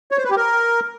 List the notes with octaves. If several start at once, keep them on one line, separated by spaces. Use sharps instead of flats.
C#5
C5
B4
G4
A#4